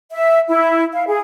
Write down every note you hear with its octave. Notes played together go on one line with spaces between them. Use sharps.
E5
E4
F5
G#4